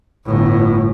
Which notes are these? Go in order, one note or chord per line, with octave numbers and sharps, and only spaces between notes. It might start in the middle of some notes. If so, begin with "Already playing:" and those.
G1 A2